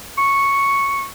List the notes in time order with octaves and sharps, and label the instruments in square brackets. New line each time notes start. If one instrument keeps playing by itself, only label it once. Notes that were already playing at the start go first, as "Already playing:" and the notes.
[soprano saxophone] C#6